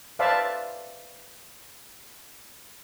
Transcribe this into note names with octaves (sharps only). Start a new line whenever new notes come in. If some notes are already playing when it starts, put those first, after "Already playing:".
B4 C5 D5 E5 F5 A5